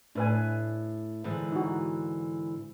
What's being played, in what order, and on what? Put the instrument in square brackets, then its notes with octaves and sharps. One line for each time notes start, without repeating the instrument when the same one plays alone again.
[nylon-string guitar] A2 [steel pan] D4 B4 G#5
[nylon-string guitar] G#2 D3 E3
[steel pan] D#4 F#4